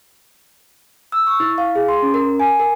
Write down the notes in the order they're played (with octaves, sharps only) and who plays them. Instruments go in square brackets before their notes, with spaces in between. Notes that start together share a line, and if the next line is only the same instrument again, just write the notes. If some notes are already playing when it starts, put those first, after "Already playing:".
[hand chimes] E6
C#6
E4
F5
G#4
C6
C#4
A#4
G#5
A#4